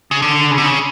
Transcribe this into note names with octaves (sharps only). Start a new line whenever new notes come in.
C#3
D3
C#3
D3
C#3